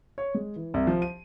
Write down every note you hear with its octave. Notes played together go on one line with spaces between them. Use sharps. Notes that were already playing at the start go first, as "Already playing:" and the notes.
C#5
G#3
E3
C2
F3
D#7